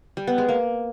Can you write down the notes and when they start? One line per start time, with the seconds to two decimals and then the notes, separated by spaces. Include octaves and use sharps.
0.17 G3
0.27 B3
0.38 G#3
0.48 A#3